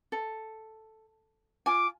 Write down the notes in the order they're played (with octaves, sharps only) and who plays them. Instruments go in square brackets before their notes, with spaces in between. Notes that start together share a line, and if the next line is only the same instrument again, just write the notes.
[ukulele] A4
[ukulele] F4 G#5 [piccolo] D6